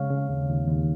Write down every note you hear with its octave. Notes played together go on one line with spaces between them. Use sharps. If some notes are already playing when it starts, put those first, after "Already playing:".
Already playing: C#3 G#3 C#5 F5
C#3
D#2
D#2
D#2